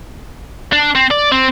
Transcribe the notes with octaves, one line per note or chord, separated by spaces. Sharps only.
D4
C4
D5
C4